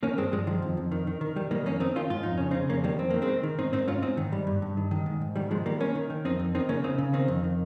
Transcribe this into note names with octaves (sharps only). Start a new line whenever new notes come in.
D#3 A#3 C#4
G2 G#3 C4
G2 F3 G#3
D#3 F3
F2
F2
D#3
D#3
D#3
D#3 G3
D#3 G3 A#3
F2 A#3 C#4
D#3 C4 D#4
D#3 C#4 F4
G#2 F4
F2 D#4
C#3 C#4
C4 D#4
C#3
F2 A#3 C#4
D#3 G3 A#3
F2 C4
D#3 A#3
G#3 C4
D#3
D#3
G#2 C4 D#4
G#2 C4 D#4
G#2 C#4 F4
G#2 C4 D#4
D#3
G#2 G3
G2
G2
D#3
D#3
G#2
G#2
D#3 G3
D#3 F3 G#3
D#3 G3 A#3
D#3 A#3 C#4
D#3
D#3
F2 C4 D#4
F2
D#3 C4 D#4
C#3 A#3 C#4
C#3 C4 D#4
C#3
D#3 C4 D#4
F2
D#3